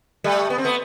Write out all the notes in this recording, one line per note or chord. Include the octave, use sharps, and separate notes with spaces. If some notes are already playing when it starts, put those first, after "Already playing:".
G3 A3
B3
C4
A3 B3